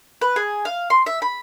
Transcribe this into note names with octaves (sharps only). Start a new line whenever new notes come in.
B4
G#4
F5
C6
E5
B5